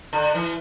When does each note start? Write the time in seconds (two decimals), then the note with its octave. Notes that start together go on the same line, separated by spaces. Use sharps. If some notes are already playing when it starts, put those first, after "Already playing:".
0.13 D3
0.35 E3